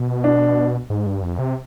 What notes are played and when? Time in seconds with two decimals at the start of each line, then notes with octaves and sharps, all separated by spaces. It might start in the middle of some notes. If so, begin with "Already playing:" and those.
Already playing: B2
0.24 D4
0.90 G#2
1.07 G2
1.22 F2
1.39 C3